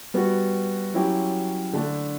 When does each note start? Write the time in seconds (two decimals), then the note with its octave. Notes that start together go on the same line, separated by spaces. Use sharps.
0.14 G3 B3 F#4
0.94 F#3 C#4 E4 G4
1.73 D3 A3 D4